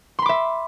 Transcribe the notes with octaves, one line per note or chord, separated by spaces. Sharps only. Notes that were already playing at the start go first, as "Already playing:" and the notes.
E5 B5 C6 D6